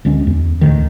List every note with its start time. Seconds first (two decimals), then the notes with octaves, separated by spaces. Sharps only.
0.05 D2 G#3 C#4
0.27 E2
0.61 A1 D2 D3 D#3